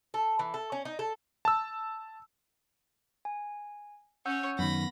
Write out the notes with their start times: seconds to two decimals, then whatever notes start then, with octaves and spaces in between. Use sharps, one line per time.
0.14 A4
0.39 E3
0.54 A4
0.72 C#4
0.85 D#4
0.99 A4
1.45 A5 E6
3.25 G#5
4.26 C#4 C#5 F#5 E6 G6
4.59 F#2 D#3 B3 B5 A#6